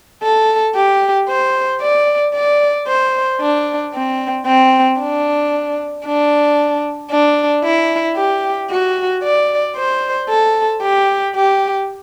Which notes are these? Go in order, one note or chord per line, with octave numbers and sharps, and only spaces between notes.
A4
G4
C5
D5
D5
C5
D4
C4
C4
D4
D4
D4
E4
G4
F#4
D5
C5
A4
G4
G4